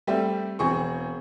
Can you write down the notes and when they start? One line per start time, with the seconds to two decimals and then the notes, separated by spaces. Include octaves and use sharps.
0.07 G3 A3 C4 G4
0.59 E1 C4 G#4 C#6